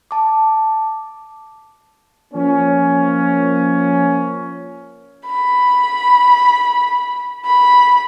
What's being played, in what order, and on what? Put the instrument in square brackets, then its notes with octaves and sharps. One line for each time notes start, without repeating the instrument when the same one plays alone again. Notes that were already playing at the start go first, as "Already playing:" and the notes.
[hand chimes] A5 D6
[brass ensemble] F3 A#3 C#4
[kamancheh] B5
B5